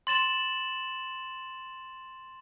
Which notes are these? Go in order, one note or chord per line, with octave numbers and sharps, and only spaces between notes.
C6 A6 E7 F#7